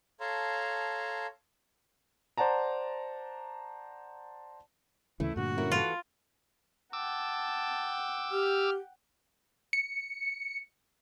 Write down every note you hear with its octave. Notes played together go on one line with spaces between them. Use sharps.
A4 C#5 F5 A5 A#5 C6
C5 D5 F#5 A5 A#5
D2 C#3 E3 A3 E4
G2 A#2 D3 F#4
C#4 E4 A#4
E3 F4 A4
F#5 G5 A5 D6 E6
G4 F6
C#7